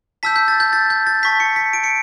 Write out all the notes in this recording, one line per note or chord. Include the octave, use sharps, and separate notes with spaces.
A5 E6 G6 B6
G6
A6
G6
A6
G6
A6
A5 C#6 G6 B6
C#7
B6
D7
C#7